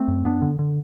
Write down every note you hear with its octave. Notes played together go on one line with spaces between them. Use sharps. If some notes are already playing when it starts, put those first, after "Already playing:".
Already playing: A3 C4
F#2
F#2 B3 D4
D3
D3